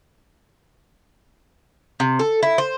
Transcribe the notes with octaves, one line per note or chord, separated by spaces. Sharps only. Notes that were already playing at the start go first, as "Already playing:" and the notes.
C3
A4
E4
C5